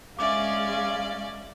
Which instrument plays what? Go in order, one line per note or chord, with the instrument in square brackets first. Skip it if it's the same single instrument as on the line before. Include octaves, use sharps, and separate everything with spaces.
[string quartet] G#3 [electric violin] C#4 D5 [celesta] E5 D6 [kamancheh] F5